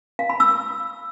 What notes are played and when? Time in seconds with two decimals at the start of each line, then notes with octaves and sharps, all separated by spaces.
0.19 F5
0.30 B5
0.40 E6